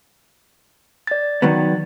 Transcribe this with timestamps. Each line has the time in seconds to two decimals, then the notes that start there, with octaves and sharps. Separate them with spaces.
1.07 D5 A6
1.42 D#3 F#3 B3